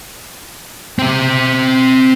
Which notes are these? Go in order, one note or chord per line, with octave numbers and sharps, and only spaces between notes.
C4 E5